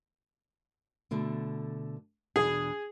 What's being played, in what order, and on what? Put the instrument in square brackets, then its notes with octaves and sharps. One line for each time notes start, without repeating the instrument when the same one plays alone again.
[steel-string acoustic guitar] B2 D3 A3
[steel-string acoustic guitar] E2 B2 D4 [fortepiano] G#4